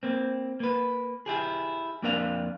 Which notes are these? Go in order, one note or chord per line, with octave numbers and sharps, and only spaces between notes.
A#3 C4
A#3 B4
E4 G4 G#4
F2 A#3 D4 A#4 D5 F5